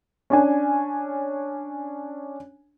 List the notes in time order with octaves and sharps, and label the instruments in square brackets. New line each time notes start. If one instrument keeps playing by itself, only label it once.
[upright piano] C#4 D4 G#5